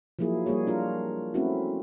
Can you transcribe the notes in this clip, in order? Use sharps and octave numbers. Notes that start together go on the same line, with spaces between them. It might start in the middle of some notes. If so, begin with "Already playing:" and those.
F3 F#3 A#3 E4 G#4
G3 A#3 G#4 C#5
D4 F4 A#4
A3 C4 C#4 E4 F#4